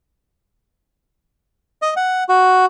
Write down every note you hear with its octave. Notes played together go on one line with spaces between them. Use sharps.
D#5
F#5
F#4